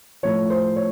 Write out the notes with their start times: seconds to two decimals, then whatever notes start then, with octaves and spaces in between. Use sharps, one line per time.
0.23 A2 F3 C#5
0.50 C5
0.76 C#5